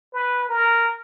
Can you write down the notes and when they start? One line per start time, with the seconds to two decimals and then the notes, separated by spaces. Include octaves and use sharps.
0.13 B4
0.49 A#4